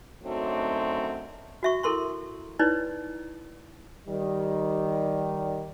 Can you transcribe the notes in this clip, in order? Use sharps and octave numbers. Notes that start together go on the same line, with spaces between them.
F#2 D3 F#3 A3 C4 D#4
F#4 E5 C#6
E4 A4 A#4 C6 C#6
D#4 E4 B4 C#5 D5
D#3 G3